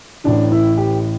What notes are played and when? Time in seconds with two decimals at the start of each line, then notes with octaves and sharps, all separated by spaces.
0.24 A1 A2 E3 D4
0.52 E4
0.77 G4